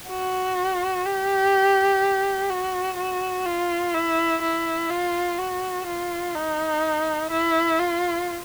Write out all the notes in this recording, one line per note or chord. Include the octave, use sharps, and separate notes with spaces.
F#4
G4
F#4
F#4
F4
E4
E4
F4
F#4
F4
D#4
E4
F4